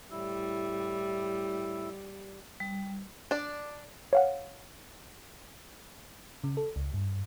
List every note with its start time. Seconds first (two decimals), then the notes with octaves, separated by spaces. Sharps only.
0.11 A2 G3 E4 E6
2.60 G3
3.31 D4 D5
4.13 C#5 F5 F#5
6.44 C#3
6.57 A4
6.76 C#2
6.94 G2